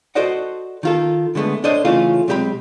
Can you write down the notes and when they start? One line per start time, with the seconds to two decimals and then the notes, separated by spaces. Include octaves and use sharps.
0.15 F#4 A4 C5 D5 D#5 F#5
0.83 D#3 F4 A4
1.35 D3 G#3 A3 B3
1.64 D4 A4 C5 C#5 D#5
1.85 C#3 E3 A3 C#4 F4
2.28 B1 G#3 C4 G4 D5 B5